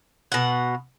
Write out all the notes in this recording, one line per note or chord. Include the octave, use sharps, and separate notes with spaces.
B2 F#5